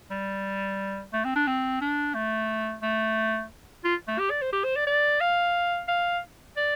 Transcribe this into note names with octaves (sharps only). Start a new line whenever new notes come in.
G3
A3
C4
D4
C4
D4
A3
A3
F4
A3
G4
D5
C5
G4
C5
D5
D5
F5
F5
D5